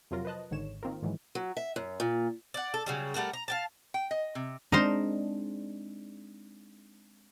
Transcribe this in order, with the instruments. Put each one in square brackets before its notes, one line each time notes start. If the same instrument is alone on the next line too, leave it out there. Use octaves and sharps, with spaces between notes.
[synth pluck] F2 C3 F#3 F4 A#4 A#6
B4 C5 D#5 A5 F#6
G#1 G#2 D3 D#3 C#5 E7
D#3 A#3 C4 F4 A#4
G#2 D#3 E3 F#3 G#3
[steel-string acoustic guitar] F#3
E5
F#2
A#2
[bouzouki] D5 F#5
A4
C#3 F#3 G3
G3 A3 F#4 A#4
A#5
F5 G5 A5
[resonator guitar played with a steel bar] G5
D#5
C3
[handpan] G#3 C4 D4 [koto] D#4 A#4 C5